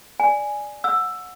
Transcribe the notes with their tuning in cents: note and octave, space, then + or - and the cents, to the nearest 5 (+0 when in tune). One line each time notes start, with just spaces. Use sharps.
D5 +0 G#5 +0
F#5 -30 E6 +10